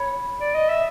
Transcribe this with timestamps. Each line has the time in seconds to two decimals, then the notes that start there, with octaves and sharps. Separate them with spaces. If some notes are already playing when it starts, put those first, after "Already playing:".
Already playing: C#5 B5
0.40 D5
0.55 D#5
0.69 E5